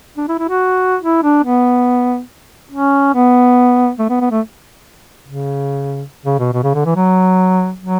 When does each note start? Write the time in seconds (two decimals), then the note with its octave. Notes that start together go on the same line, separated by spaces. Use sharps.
0.17 D4
0.28 E4
0.39 E4
0.49 F#4
1.02 E4
1.23 D4
1.44 B3
2.71 C#4
3.14 B3
3.99 A3
4.09 B3
4.20 B3
4.31 A3
5.26 C#3
6.25 C#3
6.39 B2
6.53 B2
6.63 C#3
6.74 D3
6.86 E3
6.96 F#3
7.80 F#3